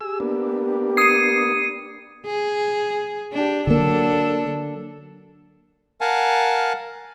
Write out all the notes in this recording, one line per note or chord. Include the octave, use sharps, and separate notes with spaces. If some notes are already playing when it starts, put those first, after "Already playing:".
G4 G#4 E6
A#3 B3 D4
D#6 G#6 C7 C#7 D#7
G#4
D4 G4
D3 F#3 A#3 D4 A4
A#4 F5 F#5 G#5 A5